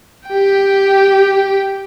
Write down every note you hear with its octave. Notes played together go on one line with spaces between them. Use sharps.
G4 G5